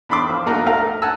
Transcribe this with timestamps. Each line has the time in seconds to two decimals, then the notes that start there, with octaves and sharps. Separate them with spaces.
0.09 E2 D4 B5 C6 D6
0.29 F3
0.46 A#2 A3 D4 D#4 F#4 A#4
0.66 A3 D#4 A#4 F5
1.02 F#5 G#5 A5 E6